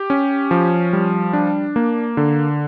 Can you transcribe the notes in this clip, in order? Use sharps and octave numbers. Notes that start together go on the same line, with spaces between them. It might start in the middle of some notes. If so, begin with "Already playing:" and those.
Already playing: G4
C#4
F3
G3
D4
A#3
D3